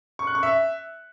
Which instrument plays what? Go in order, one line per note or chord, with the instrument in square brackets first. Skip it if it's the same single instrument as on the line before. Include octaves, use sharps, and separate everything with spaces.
[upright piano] C#6
F#6
C#6
E5